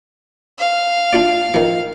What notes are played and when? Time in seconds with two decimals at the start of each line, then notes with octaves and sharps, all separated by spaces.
0.59 F5
1.13 D4 F4 D5
1.54 D#3 F3